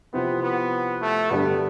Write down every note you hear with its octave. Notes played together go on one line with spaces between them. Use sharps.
C3 F3 B3 C4 E4
B3
A3
G2 D3 G3 B3 D4 A4